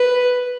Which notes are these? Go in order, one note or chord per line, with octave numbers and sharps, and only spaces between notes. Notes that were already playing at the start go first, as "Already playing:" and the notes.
Already playing: B4